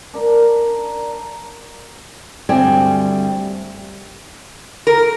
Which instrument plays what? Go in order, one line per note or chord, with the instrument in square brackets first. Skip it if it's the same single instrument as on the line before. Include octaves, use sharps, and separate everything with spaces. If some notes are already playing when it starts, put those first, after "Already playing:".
[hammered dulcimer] D4 A#4
[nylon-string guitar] D2 G2 G3 C4 G#5
[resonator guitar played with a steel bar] A#4